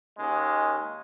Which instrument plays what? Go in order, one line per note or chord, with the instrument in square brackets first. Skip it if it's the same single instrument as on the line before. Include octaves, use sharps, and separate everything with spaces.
[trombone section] D#2 G#3 C#4